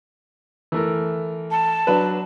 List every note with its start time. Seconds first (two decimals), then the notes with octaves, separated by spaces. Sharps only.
0.72 E3 A3 A#4
1.51 A5
1.87 F#3 D4 B4